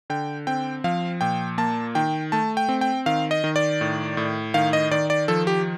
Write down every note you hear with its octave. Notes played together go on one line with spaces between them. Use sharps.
D3 G5
C4 G5
F3 F5
A#2 G5
A#3 A5
D#3 G5
A3 A5
G5
C4
G5
D#3 F5
D#5
D#3
D5
A2
A2
D#3 F5
D#5
D#3 D5
D5
F3 A4
G4